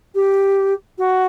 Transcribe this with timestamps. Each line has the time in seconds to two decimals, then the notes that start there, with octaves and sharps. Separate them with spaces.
0.15 G4
0.98 F#4